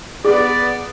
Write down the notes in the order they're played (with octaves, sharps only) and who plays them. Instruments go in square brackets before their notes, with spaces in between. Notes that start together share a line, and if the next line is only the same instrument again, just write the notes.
[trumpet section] B3 D5 [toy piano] G#4